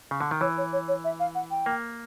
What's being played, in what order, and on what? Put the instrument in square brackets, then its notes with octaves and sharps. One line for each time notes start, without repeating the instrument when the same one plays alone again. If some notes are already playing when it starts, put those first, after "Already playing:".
[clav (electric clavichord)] C#3
D3
D#3
[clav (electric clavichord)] E3 [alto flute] C#5
[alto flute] C#5
C#5
C#5
E5
F5
F#5
G5
[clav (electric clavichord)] A#3